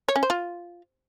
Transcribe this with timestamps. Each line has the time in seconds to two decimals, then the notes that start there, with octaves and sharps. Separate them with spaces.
0.08 C#5
0.16 C#4
0.23 C5
0.30 F4